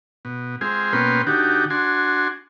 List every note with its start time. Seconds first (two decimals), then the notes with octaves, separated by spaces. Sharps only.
0.25 B2
0.61 G#3 C4 F4 G#4
0.93 B2 A#3 C#4 B4 G5 C6
1.27 D3 D#4 F#4 G4
1.70 D4 F#4 G#5 C6